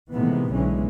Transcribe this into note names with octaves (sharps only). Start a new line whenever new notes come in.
A2 C3 D#3 E3 G#3 B3
B1 B2 D3 E3 G#3 C#4